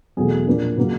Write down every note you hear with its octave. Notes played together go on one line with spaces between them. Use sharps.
E2 B2 F#3 A3 G#4
A#2 F3 A#3 D4
C#3 F#3 A#3